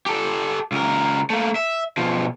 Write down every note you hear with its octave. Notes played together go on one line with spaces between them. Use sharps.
G4 A4
C#2 A#4
A3 A#3
E5
B2 F3